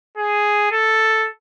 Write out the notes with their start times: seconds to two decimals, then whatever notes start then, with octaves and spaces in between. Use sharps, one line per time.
0.17 G#4
0.71 A4